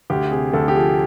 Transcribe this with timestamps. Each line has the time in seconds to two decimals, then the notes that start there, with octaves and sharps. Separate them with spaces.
0.10 D2 G4
0.31 C3 G#4
0.53 D2 A4
0.68 G4
0.75 F3 G#4